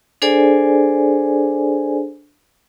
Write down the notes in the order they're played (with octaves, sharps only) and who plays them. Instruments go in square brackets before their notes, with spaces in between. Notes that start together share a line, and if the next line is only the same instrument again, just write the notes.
[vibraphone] D4 G#4 A4 C5 D5 G#5